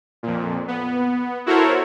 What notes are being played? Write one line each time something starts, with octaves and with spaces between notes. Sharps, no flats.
F2 A#2
B3
E4 F#4 A4 A#4 C5 C#5